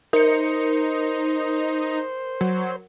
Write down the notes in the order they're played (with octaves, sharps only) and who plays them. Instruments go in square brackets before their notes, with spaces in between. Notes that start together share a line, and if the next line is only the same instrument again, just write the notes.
[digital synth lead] D#4 [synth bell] A#4 C#7 [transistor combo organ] C5
[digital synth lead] F#3